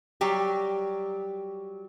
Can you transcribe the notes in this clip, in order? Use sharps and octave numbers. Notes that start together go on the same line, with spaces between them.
F#3 G3 G4